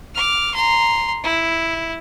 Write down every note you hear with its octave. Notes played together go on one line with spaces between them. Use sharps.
D6 F6
A#5 C6
E4